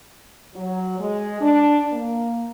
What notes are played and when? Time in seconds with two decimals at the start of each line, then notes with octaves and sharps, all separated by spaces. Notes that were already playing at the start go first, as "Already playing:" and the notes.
0.55 F#3
0.99 G#3
1.41 D4
1.92 A#3